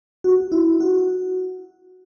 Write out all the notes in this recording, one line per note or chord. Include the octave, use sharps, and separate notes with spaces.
F#4
E4
F#4